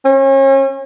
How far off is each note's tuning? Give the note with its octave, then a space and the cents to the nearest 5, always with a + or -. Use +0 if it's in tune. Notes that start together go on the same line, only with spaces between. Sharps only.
C#4 -35